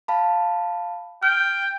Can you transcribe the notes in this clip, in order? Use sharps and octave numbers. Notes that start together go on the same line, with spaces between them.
F5 A5 B5
G5 F6